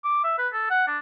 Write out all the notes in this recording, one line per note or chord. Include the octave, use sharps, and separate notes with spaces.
D6
E5
B4
A4
F#5
D4